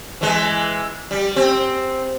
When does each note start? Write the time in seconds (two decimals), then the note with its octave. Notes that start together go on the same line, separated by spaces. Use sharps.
0.21 E3 G#3
1.11 G3
1.36 C4